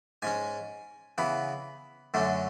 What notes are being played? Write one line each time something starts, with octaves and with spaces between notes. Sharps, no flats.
G#2 G#3 C#4 G#5
C#3 E3 B3 B5
F#2 D3 F#3 A3 C#4